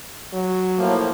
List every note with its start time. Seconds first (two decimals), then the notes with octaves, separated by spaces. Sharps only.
0.33 F#3
0.78 A2 F3 A#3